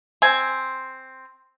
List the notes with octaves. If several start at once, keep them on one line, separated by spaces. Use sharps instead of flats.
C4 G#5